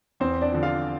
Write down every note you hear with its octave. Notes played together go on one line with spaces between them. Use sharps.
E2 C4 C5
D4 D5
D3 F3
F4 F5